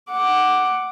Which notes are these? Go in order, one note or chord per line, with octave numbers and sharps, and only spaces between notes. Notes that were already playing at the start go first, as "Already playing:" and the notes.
F#5 D6